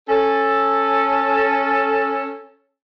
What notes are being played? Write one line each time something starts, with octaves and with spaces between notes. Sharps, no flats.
C#4 A4